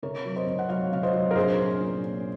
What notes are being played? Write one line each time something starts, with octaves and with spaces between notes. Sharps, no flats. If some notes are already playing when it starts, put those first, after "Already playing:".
C3 A#4 C#5
F#3
C5 D#5
C3
F#5
F#3 C#5 F5
C3 F5
C5 D#5
F#3
A#4
A#1 G#4 C5
C#4
A#2
C#4